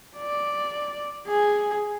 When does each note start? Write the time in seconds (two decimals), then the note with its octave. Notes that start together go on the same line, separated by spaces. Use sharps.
0.17 D5
1.27 G#4